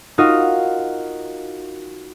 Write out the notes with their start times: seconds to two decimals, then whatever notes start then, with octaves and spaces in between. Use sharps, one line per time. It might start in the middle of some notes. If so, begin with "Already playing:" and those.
0.18 D#4 F4 F#4 A#4 D#5 F5